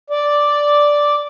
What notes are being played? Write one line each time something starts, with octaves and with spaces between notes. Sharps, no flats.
D5